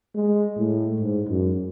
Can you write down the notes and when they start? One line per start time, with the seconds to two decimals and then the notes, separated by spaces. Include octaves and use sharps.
0.15 G#3
0.57 A2
1.01 G#2
1.29 F#2